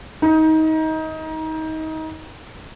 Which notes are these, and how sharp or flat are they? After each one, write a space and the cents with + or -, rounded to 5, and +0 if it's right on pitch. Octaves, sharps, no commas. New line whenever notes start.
D#4 +25